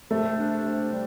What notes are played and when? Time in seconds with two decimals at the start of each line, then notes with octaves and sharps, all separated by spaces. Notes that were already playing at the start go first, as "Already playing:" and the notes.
0.10 C3 A3
0.38 D4
0.64 C3
0.90 G3